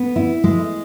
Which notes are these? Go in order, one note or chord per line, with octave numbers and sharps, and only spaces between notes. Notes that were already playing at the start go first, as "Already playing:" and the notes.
Already playing: B3
E4
G#3